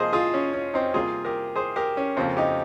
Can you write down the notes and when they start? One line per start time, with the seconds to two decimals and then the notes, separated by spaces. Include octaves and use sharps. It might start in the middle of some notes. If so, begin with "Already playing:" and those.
Already playing: C3 F3 A#3 G#4 C5 D#5
0.13 F4 G#4
0.34 C#4
0.53 C#4
0.74 C4 D#4
0.94 C3 G3 A#3 F4 G#4
1.25 G4 A#4
1.56 G#4 C5
1.76 G4 A#4
1.97 C#4
2.17 F2 C#3 F3 A#3 C4
2.37 D#4 G4